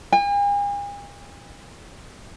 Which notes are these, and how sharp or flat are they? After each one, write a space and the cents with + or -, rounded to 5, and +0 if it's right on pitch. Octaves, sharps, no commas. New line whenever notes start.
G#5 -45